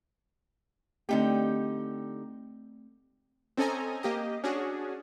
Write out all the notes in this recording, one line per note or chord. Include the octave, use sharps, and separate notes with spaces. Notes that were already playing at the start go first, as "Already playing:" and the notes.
D3 A3 C4 D#4 G4
C4 C#4 A4 D#5 G#5 A#5
A#3 G4 D#5
C#4 D4 F#4 G#4